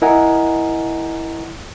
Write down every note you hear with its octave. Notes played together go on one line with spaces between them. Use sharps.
E4 A#4 D#5 F#5 G#5 A#5